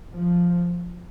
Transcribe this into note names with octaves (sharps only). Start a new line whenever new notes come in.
F3